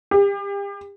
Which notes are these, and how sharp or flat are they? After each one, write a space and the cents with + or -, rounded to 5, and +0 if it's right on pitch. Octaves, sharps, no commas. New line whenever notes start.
G4 +35